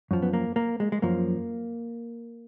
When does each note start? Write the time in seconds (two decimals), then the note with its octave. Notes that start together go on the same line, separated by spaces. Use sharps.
0.11 F#2 F3
0.22 B3
0.33 A#3
0.56 A#3
0.80 G#3
0.92 G#3
1.02 F#2 F3 A#3